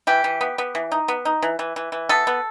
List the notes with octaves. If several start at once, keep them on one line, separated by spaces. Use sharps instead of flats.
E3 G4
E3
B3
B3
E3
D#4
B3
D#4
E3
E3
E3
E3
B3 A4
B3